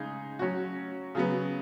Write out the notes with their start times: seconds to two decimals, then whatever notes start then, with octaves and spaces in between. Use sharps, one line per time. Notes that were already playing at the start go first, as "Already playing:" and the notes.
Already playing: C#3 G#3 D#4 G#4
0.39 F#3 C#4 F#4
1.15 C#3 F#3 B3